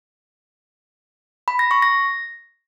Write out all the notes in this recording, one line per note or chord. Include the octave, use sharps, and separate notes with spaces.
B5
A#6
C#6
A#6